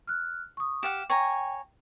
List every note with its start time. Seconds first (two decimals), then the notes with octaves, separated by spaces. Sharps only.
0.07 F6 F#6
0.57 C#6 D#6
0.83 G4 F5 F#5 E7
1.10 C#5 G5 G#5 A#5